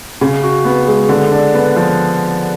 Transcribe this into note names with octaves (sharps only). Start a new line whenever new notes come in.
C#3
F#4
B3
G#3
D3
D4
B3
F3